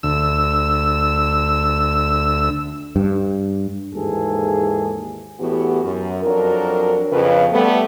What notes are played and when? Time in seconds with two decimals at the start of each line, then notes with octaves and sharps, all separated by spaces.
0.03 D2 E6
2.96 G2
3.94 D#2 G#2 E3 G#4 A4
5.40 E2 A2 E3 B3 F#4 G4
5.83 F#2
6.23 F2 F#3 D4 A#4
7.12 F2 C#3 B4
7.52 G3 A3 B3